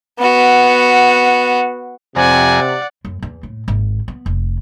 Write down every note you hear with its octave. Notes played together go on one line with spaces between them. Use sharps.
B3 F#4
F2 C3 C4 D5 F#5 G#5 A#5
F#2
E2
A2
G#1
B3
F1